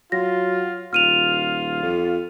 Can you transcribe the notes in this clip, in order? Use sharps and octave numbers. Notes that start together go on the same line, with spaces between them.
F#3 F4 A#6
D#1 F4 F6 D#7 F7
F2